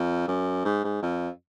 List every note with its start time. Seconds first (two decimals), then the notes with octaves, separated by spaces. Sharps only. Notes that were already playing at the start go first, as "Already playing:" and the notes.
Already playing: F2
0.28 F#2
0.65 G#2
0.84 G#2
1.02 F2